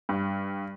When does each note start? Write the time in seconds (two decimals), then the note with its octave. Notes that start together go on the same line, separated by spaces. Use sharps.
0.09 G2